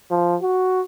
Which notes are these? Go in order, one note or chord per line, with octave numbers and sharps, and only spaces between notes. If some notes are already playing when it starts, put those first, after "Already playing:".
F3
F#4